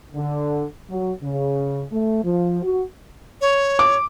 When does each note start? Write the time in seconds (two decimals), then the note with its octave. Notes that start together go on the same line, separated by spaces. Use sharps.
0.14 D3
0.89 F#3
1.22 C#3
1.91 A3
2.23 F3
2.62 F#4
3.41 C#5
3.79 D6